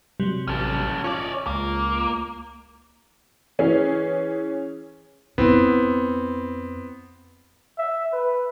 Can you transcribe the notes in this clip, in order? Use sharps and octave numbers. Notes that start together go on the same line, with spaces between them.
C3 F#3 G3
A1 C#4 A4
C#4 F4 C#5 D5
C#2 A#3
E3 C#4 G#4
F2 B3 C4 E4
E5
B4